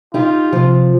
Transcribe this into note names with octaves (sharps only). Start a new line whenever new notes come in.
D#4 F4 G4
C3 F3